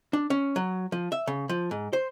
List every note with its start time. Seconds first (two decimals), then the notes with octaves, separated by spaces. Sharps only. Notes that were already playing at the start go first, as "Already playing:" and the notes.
0.13 D4
0.30 C#4
0.56 F#3
0.92 F3
1.12 E5
1.27 C#3
1.49 F3
1.71 G#2
1.93 C5